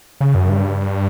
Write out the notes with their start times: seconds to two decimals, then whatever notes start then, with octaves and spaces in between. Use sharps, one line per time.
0.21 C#3
0.35 F#2
0.49 G2